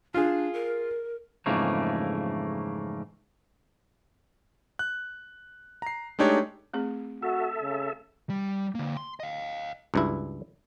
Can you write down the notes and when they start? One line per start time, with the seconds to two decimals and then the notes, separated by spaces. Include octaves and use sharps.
0.14 D4 F4 G#4
0.54 A#4
1.46 F2 G#2 C#3 E3 A3 A#3
4.79 F#6
5.82 A#5 C7
6.19 G#3 A3 D4 D#4 G4 C#5
6.74 A3 C4 G#4
7.22 F#4 A4 E5
7.63 C#3
8.30 G3
8.75 D3 A#3
8.97 C6
9.20 D#5 F5
9.94 C#2 G2 E4